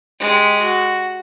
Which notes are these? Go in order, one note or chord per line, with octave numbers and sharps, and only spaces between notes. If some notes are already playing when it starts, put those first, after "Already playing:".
G#3 G4
F#4